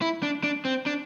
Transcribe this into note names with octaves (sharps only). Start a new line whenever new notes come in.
E4
D4
D4
C4
D4